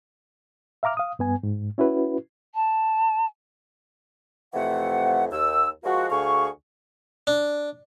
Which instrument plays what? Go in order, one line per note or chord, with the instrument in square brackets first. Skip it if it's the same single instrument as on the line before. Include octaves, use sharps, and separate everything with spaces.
[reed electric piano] E5 F5 A#5 D6 F6
F5 D#6
G2 B3 G#5
G#2
C#4 E4 F#4 B4
[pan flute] A5
[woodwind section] F2 C3 E3 A3 F#5
D#2 E6
F3 G#3 A#3 F#4
D2 G#4 F5 C#6
[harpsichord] D4